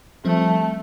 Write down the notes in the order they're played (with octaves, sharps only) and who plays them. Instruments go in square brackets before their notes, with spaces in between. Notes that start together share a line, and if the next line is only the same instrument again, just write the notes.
[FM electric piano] F3 G3 C4 [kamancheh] A3